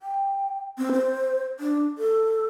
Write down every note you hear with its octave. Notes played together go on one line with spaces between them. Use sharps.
G5
C4
C5
D4
A4